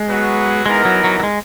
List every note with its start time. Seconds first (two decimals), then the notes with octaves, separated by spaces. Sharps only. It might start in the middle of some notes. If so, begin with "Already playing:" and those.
Already playing: G#3
0.09 F#3 B3 F#4
0.66 E3 G#3 B3 D#4 A#4
0.85 F#3
1.04 F#3
1.20 F#3
1.23 G#3